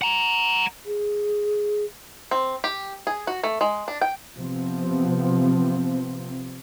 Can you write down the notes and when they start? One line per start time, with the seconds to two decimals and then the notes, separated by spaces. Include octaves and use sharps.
0.02 F#5 A#5
0.85 G#4
2.31 C4
2.64 G4
3.07 G#4
3.27 F#4
3.43 A3
3.61 G#3
3.88 D4
4.02 G5
4.37 C3 F3 B3 C4